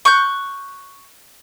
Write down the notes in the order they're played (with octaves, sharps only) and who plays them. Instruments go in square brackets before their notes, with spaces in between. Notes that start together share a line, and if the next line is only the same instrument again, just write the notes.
[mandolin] C#6 F#6 G6